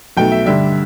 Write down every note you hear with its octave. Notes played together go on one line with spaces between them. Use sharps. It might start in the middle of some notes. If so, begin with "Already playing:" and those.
B1 B2 A3 G5
E5
G2 D3 G3 D4 E5